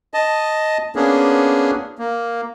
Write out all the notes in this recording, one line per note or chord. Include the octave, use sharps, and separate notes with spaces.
D#5 A5
A#3 B3 C#4 D4 G#4
A#3